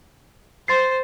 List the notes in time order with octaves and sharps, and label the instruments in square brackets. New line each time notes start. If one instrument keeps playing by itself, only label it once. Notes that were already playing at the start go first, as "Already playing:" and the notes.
[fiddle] C5 [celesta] C6 A6 C7